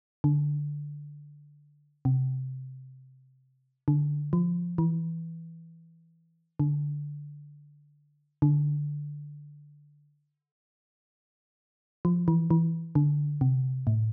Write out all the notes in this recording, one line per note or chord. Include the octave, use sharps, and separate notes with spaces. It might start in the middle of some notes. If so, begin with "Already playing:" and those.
D3
C3
D3
F3
E3
D3
D3
F3
E3
E3
D3
C3
A2